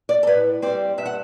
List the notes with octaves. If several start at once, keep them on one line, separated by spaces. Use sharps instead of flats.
D5
A4
A2 B4
G3 C4 D5
G2 E5
F#5